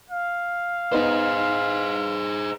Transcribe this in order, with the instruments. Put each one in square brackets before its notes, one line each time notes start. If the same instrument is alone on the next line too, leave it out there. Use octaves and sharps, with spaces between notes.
[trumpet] F5
[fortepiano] B3 D#4 [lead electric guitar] G#4 C5